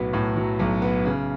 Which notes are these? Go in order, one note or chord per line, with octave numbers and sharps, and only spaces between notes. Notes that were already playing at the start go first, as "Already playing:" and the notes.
Already playing: B1 A2 F#3 B3
A2
F#3
B1
B3
C#3